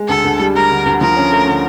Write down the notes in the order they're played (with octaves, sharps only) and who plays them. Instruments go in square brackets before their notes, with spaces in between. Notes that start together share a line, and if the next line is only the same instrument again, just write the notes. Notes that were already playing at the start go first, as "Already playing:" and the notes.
Already playing: [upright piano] G#3
[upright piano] D2 [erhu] A4
[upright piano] D2
G3
[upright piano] G3 [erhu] A#4
[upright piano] D3
D2
[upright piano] F3 [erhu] A#4
[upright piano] C#4
A3
D3